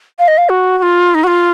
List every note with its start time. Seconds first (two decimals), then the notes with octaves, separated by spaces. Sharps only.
0.19 F5
0.28 D#5
0.38 F5
0.49 F#4
0.78 F#4
0.82 F4
1.15 D#4
1.24 F#4
1.27 F4